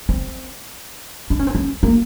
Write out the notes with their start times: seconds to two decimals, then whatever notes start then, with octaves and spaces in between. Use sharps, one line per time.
0.09 C4
1.30 D4
1.39 C#4
1.47 C4
1.55 C#4
1.83 A#3